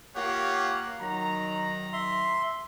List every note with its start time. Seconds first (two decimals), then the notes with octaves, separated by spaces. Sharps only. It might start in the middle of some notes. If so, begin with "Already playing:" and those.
0.16 A#3 F4 G4 C#5 F#5
1.00 D#3 F#3 A#5
1.93 E5 C6